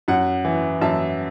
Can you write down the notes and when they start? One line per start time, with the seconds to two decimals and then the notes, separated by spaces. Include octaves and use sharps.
0.08 F#2 F#5
0.45 E3
0.81 F#2 E5 A5